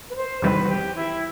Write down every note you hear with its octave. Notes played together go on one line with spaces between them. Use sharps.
B4
C5
E2 C3 D#3 G3 C4 B4
F#4
G4
E4